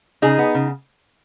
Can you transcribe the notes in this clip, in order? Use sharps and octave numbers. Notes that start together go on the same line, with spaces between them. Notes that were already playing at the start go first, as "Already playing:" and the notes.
C#3 D#4 G#4
B3
C#3